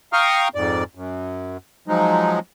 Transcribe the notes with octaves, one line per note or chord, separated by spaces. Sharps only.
F5 G5 A#5 C#6 D#6 F6
F2 G#2 D5
F#2
F3 F#3 G#3 D#4